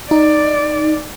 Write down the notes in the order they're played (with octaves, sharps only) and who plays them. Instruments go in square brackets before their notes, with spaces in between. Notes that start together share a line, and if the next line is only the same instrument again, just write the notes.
[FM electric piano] D#4 [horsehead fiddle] D5